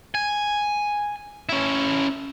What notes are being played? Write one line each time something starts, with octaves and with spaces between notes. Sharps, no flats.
G#5
C#4 E4